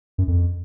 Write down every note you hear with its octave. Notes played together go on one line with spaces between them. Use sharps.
F#2
F2